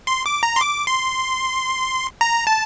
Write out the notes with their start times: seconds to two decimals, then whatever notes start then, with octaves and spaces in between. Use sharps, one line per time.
0.07 C6
0.26 D6
0.43 A#5
0.56 C6
0.61 D6
0.87 C6
2.21 A#5
2.47 A5